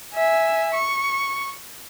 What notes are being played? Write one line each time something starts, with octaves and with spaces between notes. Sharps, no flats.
E5 G#5
C#6